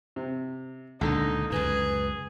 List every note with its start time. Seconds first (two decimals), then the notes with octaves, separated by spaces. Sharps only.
0.16 C3
1.01 C#2 A#2 D3 D#3 D#4
1.52 C#2 F#2 G#4 B4